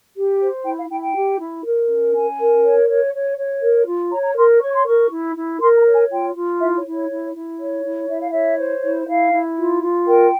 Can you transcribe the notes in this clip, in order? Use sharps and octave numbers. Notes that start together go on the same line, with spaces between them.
G4
C5
E4 G5
F5
E4 G5
G5
G4
E4
A#4
C#4
C#4 G#5
A#4
C#5
C#5
C#5
C#5
A#4
F4
C#5 A#5
A#5
A#4 C6
C#5 C#6
C6
A#4 C#6
E4
E4
A#4 C6
A#5
C#5
G#5
F4 G5
F4
E4 E5
C#5
E4
C#5
E4
E4
C#5
E4
E4 E5
F5
C#5 E5
C5
E4
E4 F5
E4
F4
F4
A#4 G5